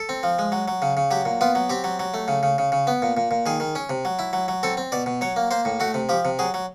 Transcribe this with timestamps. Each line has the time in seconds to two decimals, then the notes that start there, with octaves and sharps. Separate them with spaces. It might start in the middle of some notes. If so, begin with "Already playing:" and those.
Already playing: A4
0.09 C4
0.23 F3
0.39 G#3
0.52 F#3
0.68 F#3
0.82 C#3
0.97 C#3
1.11 F#3 G4
1.25 A#2
1.41 B3 F4
1.55 F#3
1.69 C4 G4
1.84 F#3
1.99 F#3
2.14 A3
2.28 C#3
2.43 C#3
2.58 C#3
2.72 C#3
2.87 B3
3.02 A#2
3.17 A#2
3.31 A#2
3.46 D#3 G#4
3.60 D#3
3.75 C#4
3.90 C3
4.05 F#3
4.19 E4
4.33 F#3
4.48 F#3
4.63 C4 A4
4.77 C4
4.92 B2 D5
5.06 B2
5.21 F#3 C#5
5.36 A#3
5.51 A#3 C5
5.65 A2
5.80 A3 F#4
5.94 C3
6.09 F3 G4
6.25 C3
6.39 F#3 G#4
6.54 F#3